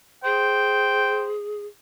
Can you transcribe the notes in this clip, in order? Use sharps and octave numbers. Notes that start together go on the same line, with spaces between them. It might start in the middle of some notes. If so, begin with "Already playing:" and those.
G#4 C5 G5